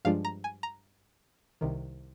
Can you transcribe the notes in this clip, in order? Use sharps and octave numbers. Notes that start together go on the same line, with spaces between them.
G2 F3 G#3 D4 F4 F5
A#5
G#5
A#5
C2 C3 D#3